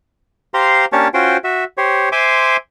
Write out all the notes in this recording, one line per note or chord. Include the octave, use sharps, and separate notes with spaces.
G4 C5 F5 A#5 C6
A#3 C#4 D4 G4 C#5 A5
C#4 F4 F#4 C5 G5
F#4 E5
G4 C5 C#5
C5 E5 G#5 C6 D6